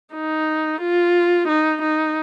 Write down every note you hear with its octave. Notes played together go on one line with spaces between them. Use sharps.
D#4
F4
D#4
D#4